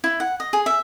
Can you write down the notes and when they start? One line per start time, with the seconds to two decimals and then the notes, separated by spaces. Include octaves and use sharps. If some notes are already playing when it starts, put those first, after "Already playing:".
0.04 E4
0.20 F#5
0.40 D#5
0.53 G#4
0.66 E5